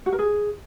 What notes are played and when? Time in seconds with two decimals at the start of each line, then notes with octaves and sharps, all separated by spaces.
0.06 F#4
0.12 A#4
0.19 G#4